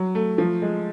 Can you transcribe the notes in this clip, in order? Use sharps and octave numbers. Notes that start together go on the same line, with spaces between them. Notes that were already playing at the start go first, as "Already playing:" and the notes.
Already playing: F#3
A3
F3
G#3